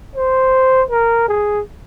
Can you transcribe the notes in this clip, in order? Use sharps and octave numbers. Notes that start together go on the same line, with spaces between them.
C5
A#4
G#4